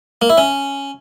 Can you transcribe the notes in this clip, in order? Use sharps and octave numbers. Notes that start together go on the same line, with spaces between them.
A#3
E4
C#4